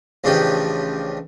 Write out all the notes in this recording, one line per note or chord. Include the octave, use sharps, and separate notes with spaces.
A1 C#3 F3 D4 D#4 G4